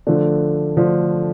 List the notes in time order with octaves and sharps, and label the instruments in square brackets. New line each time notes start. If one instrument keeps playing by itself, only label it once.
[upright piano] D3 F3 A3 D4
D3 F3 A3 D4